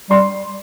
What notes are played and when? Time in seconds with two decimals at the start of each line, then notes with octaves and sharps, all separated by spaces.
0.10 G3 C6